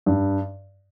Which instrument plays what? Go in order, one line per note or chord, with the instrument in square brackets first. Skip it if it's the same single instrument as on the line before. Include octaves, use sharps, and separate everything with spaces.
[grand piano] G2